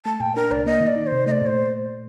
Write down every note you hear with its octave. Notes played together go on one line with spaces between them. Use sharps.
A3 A5
A#2 G5
D4 A#4
C2 D5
A#3 D#5
D#3
D5
D#4
C5
C3
A3 D#5
D5
A#2 C5